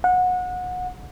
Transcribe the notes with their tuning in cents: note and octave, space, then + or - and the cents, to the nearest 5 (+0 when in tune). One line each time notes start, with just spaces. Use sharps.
F#5 -25